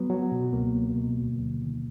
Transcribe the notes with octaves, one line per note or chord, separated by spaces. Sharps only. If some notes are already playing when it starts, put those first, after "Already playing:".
Already playing: F#3 B3
F#3
B2
C#2 A#3
C#2
B2
D2
D2
D#3